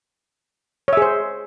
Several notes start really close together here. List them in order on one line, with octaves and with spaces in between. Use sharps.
C#5 E5 G#4 C5